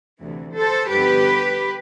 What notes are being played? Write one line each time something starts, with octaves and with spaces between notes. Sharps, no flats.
D2 C3 E3
A4 C5
G2 D3 F3 B3 G4 B4